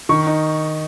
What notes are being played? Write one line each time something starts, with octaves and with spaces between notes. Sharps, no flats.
D#3 C#6
D#4